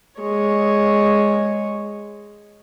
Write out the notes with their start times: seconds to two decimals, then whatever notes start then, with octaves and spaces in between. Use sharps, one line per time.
0.20 G#3 C#5